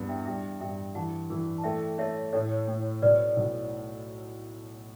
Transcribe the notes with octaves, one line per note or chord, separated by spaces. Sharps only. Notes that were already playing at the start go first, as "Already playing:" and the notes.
Already playing: E2 G2 B3
E5 G5
G2 E5 G5
G2 E5 G5
E3 F#5 A5
E3
A5
A3 E5 G5
A3 C#5 E5
A2 A4 C#5
A2
B1 B4 D5
B1